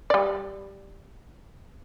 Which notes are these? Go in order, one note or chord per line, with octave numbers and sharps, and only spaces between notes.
G3 D5